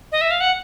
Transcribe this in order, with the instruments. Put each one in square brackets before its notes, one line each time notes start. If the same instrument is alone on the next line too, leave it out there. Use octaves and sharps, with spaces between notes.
[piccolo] D#5
E5
F5
F#5